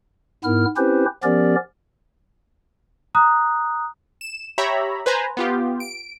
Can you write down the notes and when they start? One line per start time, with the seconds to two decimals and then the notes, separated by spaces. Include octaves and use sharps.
0.44 G#2 B3 E4 A#4 F6
0.77 C4 C#4 E4 G4 B4 C5
1.23 F3 B3 C#4 G4 A#4 D5
3.15 A#5 D#6 F#6
4.21 E7
4.58 G4 C#5 E5 A#5 B5
5.06 B4 C5 G#5 A#5
5.37 B3 F4 G4
5.80 D7